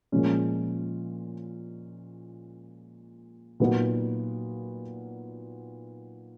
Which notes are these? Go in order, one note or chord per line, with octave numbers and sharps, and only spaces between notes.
A#2 F3 G#3 C#4
A#2 F#3 B3 D#4 F#4